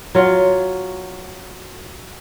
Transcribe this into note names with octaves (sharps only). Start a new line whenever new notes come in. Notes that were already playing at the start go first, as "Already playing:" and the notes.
F#3 F4